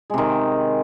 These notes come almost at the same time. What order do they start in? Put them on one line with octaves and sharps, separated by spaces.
G#3 C3 D#3